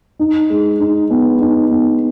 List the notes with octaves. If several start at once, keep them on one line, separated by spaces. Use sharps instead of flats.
D#4
G#3
D#4
B3
D#4
B3